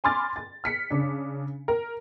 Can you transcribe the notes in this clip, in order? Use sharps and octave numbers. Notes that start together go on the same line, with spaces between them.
G#5 B5 C6 D6 F6 A6
A6
F6 B6 C#7
C#3 D4
A#4